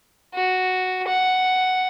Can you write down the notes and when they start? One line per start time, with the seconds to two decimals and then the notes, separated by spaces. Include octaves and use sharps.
0.34 F#4
1.07 F#5